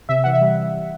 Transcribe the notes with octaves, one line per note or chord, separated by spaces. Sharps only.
C3 E5
E3 F#5
E5
G3